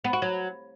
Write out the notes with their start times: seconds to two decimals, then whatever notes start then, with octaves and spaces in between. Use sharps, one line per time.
0.04 B3
0.13 F#4
0.22 F#3